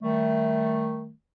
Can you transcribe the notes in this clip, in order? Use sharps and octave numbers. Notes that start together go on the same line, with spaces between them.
D#3 G3 A3